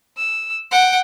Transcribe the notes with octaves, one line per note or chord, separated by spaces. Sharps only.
E6
F#5 G5